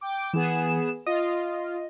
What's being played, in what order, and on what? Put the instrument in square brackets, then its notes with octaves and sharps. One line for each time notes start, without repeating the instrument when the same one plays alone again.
[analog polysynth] G5 D6
[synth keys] E3 [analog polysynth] B3 G#4 E7
[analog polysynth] F4 [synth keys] D#5